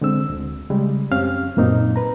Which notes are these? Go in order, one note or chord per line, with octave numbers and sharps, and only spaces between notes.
D3 G#3 C4 E6
D2
C#3 G3 G#3
F#2 C4 C#4 G4 F5 F6
F#2 A#2 A#3 C4 D#4
B4 A#5